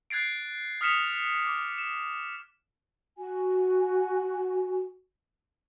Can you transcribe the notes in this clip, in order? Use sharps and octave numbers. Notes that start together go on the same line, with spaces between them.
F#6 G#6 A6 C7 D7
D#6 F6 B6 C#7 E7 F7
D6
E7
F#4 G#5